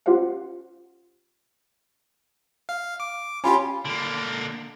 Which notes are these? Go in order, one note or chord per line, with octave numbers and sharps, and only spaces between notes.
C#4 F4 G4 C5 F5 F#5
F5
D6
C#4 F4 G4 G#5 B5 C6
D3 A#3